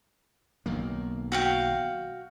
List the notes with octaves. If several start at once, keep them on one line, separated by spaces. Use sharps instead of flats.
B1 D#3 A#3
F#4 F5 G5